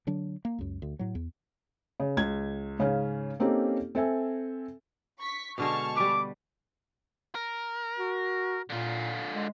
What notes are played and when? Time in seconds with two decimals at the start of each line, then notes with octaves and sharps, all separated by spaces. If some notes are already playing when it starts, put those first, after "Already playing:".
0.07 D3 F#3 D4
0.45 A#3
0.58 C#2 F#2
0.82 D2
0.99 A2 F#3
1.15 E2
2.00 C#3
2.17 C#2 G#6
2.79 G#2 C#3 C#4 F5
3.40 A#3 C4 C#4 D#4 G4 A4
3.95 C4 A4 E5 G#5
5.20 C#6 B6
5.58 B2 D3 G#3 A5 C#6 F6
5.96 G3 B4 D6
7.35 A#4
7.99 F#4
8.70 A#2 D3 F4
9.33 G#3